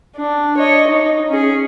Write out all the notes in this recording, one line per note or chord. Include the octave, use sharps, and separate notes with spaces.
D4
C#5 D#5
D#4
C#4 G#4